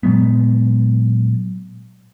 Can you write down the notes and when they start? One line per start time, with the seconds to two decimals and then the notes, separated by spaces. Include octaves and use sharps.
0.03 A#2 F#3 G#3 B3